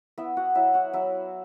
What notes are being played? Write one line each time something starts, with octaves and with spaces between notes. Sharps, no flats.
B3 E4 E5
F#4 F#5
F#3 E4 E5
F#4 F#5
F#3 E4 E5